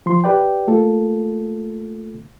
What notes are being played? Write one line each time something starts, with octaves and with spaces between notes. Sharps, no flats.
F3 C6
G4 B4 D5 G5
A3 A#3 F4 A4